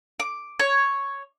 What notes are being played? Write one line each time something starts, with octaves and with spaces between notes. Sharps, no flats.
D6
C#5